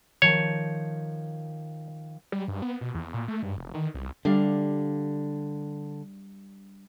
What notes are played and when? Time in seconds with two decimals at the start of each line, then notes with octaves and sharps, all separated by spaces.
0.22 D#3 F3 C#5 A5
2.32 G3
2.48 G2
2.62 B3
2.81 B2
2.94 E2
3.14 A#2
3.28 A3
3.43 G2
3.57 F1
3.74 D#3
3.94 C2
4.25 D3 G3 D4 F5